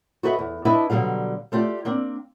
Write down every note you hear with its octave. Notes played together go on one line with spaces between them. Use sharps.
F#4 A4 B4 C5 D#5 E5
E2
D4 E4 B4 D#5 E5 A5
B2 D3 F#3 G3 F5
A3 F4 G4 D5
A#3 C4 D4